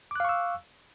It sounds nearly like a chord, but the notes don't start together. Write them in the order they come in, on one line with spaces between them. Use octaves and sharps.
D6 F#6 F5 C#6 E6